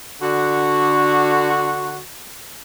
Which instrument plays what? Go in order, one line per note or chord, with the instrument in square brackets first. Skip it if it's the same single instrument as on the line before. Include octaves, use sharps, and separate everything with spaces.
[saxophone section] D3 F#4